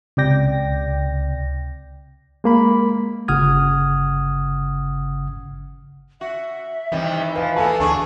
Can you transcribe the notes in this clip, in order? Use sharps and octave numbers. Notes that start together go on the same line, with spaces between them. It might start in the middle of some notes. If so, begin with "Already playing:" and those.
C#2 C3 D5 G5 A#6
G#3 A#3 B5
G1 C#3 F#5 D#6 F6 G#6
F#4 E5
C3 D#3 E3 G3 D#4
F3 B4 F5
A#3 B3 F#4 A4 G#5 A5
D2 D4 G#4 C#6